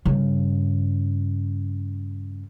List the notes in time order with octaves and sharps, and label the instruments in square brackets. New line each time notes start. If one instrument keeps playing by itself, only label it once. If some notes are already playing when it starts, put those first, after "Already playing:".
[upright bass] G2 C#3